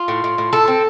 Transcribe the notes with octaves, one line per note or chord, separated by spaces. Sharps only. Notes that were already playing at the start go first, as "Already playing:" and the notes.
Already playing: F4
A2
A2
A2
A2 A4
C4